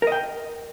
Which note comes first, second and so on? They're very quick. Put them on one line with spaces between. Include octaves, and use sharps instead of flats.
A#4 D#5 G5